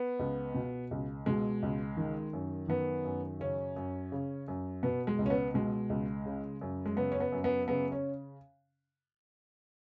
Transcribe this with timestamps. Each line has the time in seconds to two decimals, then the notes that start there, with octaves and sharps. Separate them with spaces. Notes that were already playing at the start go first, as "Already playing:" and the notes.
Already playing: B3
0.19 C#2
0.54 B2
0.91 C#2
1.26 B2 G#3
1.62 C#2
1.97 D#3
2.33 F#2
2.68 D#3 B3
3.05 F#2
3.40 C#3 C#4
3.76 F#2
4.12 C#3
4.48 F#2
4.83 B2 B3
5.07 G#3
5.18 C#2
5.26 C#4
5.30 B3
5.54 B2 G#3
5.89 C#2
6.26 C#3
6.61 F#2
6.86 G#3
6.96 C#3 B3
7.12 C#4
7.20 B3
7.32 F#2
7.44 B3
7.68 C#3 B3
7.92 C#4